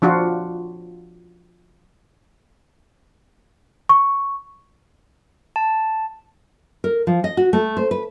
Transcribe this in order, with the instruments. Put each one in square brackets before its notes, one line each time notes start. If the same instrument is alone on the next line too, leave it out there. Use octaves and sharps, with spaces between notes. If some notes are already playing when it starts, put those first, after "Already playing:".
[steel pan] F3 D4 F4 F#4
[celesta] C#6
[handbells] A5
[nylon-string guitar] A#4
F3
D#5
F#4
A3
C5
B4